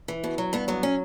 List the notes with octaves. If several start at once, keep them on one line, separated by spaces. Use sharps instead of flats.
E3
B2
F#3
G2 B3
F#3 B3
C#4